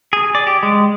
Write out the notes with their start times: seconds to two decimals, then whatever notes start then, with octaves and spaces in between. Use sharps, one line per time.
0.13 G#4
0.35 D5
0.47 G4
0.63 G#3